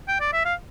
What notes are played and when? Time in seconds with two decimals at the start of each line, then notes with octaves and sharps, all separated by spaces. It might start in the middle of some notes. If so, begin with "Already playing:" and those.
0.08 G5
0.20 D5
0.33 E5
0.45 F5